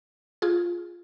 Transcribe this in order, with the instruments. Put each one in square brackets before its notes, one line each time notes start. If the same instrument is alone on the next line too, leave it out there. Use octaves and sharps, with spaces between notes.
[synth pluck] F4 G#4